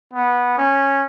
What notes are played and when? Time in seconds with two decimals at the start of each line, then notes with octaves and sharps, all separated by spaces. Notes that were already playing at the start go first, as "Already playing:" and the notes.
0.14 B3
0.58 C#4